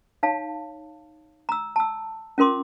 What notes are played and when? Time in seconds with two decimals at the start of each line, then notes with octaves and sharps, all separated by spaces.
0.23 D#4 C#5 F5 A5
1.49 A#5 E6
1.76 A5 E6
2.38 C#4 F4 A#4 C6 D6